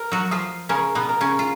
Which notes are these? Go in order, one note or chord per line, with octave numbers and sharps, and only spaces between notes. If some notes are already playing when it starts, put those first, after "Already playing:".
Already playing: A#4
F#3 F#4
F3 F4 D#6
C#3 C#4 A#4
B2 B3
A#4
C#3 C#4
F4